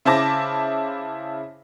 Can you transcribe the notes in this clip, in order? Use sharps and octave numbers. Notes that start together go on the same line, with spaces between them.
C#3 E4 C5 A5 D6 A#6